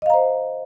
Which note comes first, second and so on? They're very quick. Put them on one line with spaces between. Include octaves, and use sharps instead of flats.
D#5 F5 A#5 C5